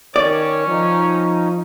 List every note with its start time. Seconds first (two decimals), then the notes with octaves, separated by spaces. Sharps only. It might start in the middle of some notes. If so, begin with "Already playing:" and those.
0.16 D#3 C#4 C#5 D5
0.68 F3 D#4